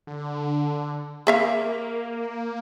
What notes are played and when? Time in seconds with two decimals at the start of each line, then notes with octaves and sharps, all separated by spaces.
0.07 D3
1.27 A#3 G#4 E5 F5